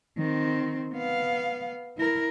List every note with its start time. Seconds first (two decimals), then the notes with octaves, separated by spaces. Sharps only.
0.18 D#3 C4
0.94 B3 F5
1.98 E4 A#4